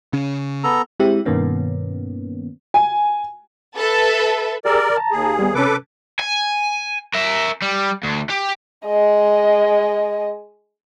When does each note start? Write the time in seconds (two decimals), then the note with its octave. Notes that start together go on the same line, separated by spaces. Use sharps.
0.13 C#3 C#4
0.64 B3 A4 A#5
1.00 G#3 C4 E4 G4 E5
1.25 G2 B2 D#3 A#3 B3 C#4
2.74 G#5
3.76 A4 B4 E5
4.65 G4 G#4 A#4 D5 E6
4.97 A5 A#5
5.12 D#2 G#4
5.39 G3 B3
5.55 C3 C#4 A4 B4 D6
6.19 G#5
7.14 A#4 E5
7.62 G3
8.03 D2
8.30 G4
8.86 G#3 D#5